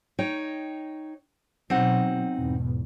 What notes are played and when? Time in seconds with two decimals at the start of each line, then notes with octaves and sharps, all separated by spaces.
0.19 D#4 C#5 G5
1.70 B2 F#3 C4 D#4 F#5
2.36 E2 G#2 B2